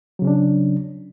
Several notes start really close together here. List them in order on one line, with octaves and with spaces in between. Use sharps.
F#3 C#3 C#4 D4